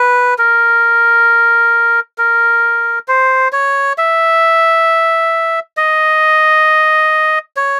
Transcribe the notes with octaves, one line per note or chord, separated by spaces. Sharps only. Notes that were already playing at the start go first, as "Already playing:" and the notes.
Already playing: B4
A#4
A#4
C5
C#5
E5
D#5
C#5